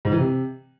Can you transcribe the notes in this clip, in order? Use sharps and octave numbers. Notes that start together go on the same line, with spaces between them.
G#2
E3
C3